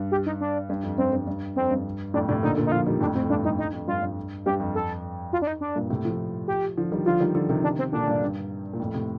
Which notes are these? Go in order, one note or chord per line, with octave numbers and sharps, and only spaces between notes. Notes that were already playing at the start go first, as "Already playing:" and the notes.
Already playing: G2
G4
D#4
D4
G2
F2
G2 C4
G2
G2
F2 C4
G2
F2 A2 D4
A2 C3 D4
A#2 D3 D#4
A#2 D3
D#4
D3 F3 F4
D#3 G3
F2 A2 D4
F2 A2 C4
G2 D4
G2 D#4
G2 D#4
F2
G2 F4
G2
G2 G4
F2
F2 A4
F4
D4
D#4
D4
G2 A#2
A2 C3
F3 A3
G4
D3 F3
D#3 G3
D3 F3 F4
D#3 G3
D3 F3
C3 D#3
D4
C4
A#2 D3 D4
G2 A#2
G2
A#2
F2 A2
A2 C3